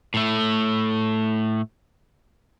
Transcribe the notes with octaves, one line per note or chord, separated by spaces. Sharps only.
A2 A3